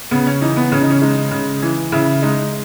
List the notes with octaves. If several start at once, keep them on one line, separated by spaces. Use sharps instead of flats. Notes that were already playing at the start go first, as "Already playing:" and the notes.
C#3 B3
C#4
E3 D#4
B3
C#3 C#4
D#4
C#4
G#3 D#4
C#3
E3
C#3 E4
G#3 D#4